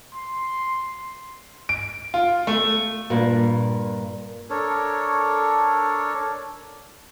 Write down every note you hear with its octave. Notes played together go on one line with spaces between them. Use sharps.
C6
D7
F4
A3
G2 A#2
D4 A4 A#4 C#5